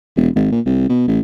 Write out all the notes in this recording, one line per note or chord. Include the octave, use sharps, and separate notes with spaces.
E1
G#1
A#2
C2
B2
A1